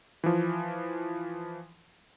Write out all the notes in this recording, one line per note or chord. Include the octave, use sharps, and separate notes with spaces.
E3 F3